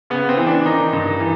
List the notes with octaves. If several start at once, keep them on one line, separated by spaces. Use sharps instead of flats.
C#3 B3
C4
E3
D4
D#3 D#4
G2
E3